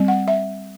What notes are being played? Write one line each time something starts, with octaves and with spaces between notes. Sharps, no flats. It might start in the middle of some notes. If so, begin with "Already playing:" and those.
Already playing: G3 C4
F#5
E5